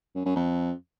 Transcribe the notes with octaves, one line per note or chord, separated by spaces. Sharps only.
F#2
F#2
F2